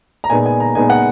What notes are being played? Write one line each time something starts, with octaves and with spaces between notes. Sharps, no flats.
A#5
A#2 G#3 B3 D#4 G#5
G#5
A#5
A#2 G#3 B3 D#4 G#5
F#5